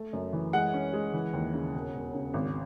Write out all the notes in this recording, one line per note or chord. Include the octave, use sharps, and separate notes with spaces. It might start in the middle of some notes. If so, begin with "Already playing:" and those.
Already playing: A3
F#2
E3
G#3 F#5
C#4
G#3
E3
D#2
C#3
E1
E1
C#3
G#1